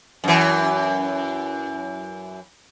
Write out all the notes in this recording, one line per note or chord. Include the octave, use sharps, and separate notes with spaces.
F#2 E3